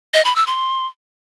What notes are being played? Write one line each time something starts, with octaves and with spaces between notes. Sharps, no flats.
D#5
B5
E6
C6